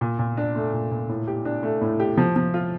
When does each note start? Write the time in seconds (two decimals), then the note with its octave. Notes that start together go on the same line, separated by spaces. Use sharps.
0.01 A#2
0.19 A#2
0.37 D4
0.56 A3
0.73 A#2
0.91 A#2
1.09 A2
1.27 G4
1.45 D4
1.63 A3
1.81 A2
2.00 G4
2.17 F3
2.36 F3
2.54 F4